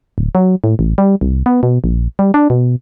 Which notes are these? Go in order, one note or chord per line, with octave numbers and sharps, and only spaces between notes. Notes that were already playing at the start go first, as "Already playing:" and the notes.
D1
F#3
A2
A1
G3
C2
B3
B2
A#1
G3
D4
B2